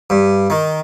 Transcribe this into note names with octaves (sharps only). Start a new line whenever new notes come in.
G2
D#3